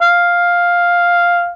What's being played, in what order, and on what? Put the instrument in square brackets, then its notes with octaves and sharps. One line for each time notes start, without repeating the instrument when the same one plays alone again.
[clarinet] F5